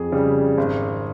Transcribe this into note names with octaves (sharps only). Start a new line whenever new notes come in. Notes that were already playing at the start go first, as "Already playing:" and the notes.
Already playing: F2 G#4
C#3 G3
G#1